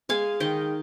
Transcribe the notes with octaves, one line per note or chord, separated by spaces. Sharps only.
G#3 F5 G#5
D#3 D#5 G5